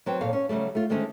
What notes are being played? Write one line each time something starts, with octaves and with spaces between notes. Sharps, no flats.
F#3 C4 B4 G5
D#2 A#2 A4 C#5 F5
C#4
C#3 F#3 G3 A3
A3 F4
D3 D#3 G#3 A3 C4 C#4